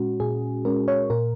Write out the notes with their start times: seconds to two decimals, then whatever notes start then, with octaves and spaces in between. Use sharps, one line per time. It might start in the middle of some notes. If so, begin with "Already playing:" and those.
Already playing: A#2 G#3 C#4 F#4
0.20 A#2 G#4
0.65 G#3 C#4 A#4
0.88 C#5
1.10 A#2 A#4